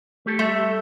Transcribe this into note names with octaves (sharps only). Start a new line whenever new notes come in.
A3 G4 A4
G3 A3 E5